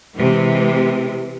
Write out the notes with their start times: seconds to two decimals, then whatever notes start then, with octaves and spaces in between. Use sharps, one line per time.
0.16 C3 E3 G#3